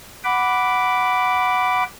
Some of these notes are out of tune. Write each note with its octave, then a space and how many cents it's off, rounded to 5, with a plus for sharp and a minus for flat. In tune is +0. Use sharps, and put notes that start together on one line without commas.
F#5 +0 B5 +0 D6 -5